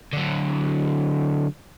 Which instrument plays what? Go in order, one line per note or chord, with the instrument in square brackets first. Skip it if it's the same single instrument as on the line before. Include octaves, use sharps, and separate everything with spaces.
[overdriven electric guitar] D3 F#3